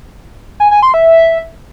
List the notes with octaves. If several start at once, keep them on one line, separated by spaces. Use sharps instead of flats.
G#5
G#5
C6
E5